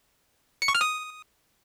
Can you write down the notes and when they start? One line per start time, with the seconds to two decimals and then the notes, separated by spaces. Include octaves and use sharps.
0.62 C#7
0.68 C#6
0.75 F6
0.81 D#6